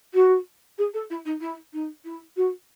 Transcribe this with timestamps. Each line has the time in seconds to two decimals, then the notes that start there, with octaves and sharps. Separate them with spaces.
0.14 F#4
0.78 G#4
0.94 A4
1.10 E4
1.25 D#4
1.41 E4
1.73 D#4
2.05 E4
2.36 F#4